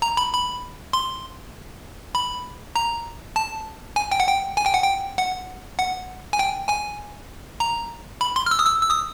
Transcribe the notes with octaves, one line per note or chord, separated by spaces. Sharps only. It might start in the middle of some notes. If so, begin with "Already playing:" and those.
A#5
B5
B5
C6
B5
A#5
A5
G#5
G5
F#5
G5
G#5
G5
F#5
G5
F#5
F#5
G#5
G5
G#5
A#5
B5
C6
F6
E6
D#6
E6
E6
D#6